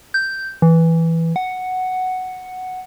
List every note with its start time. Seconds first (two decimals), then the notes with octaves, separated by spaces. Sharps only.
0.14 G6
0.62 E3
1.36 F#5